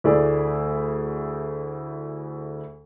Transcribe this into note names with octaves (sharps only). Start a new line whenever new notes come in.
D2 A3 E4 G#4 D5